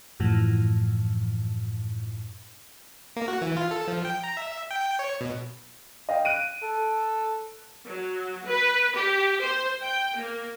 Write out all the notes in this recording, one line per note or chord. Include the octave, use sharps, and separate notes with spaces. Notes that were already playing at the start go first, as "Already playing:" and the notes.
F#2 A2 E3 F3
A#3
F#4
E3
F4
A4
F3
G5
A#5
E5
G5
C#5
B2
D#5 F5 G5
F#6 D7 D#7
A4
F#3
B4
G4
C5
G5
A#3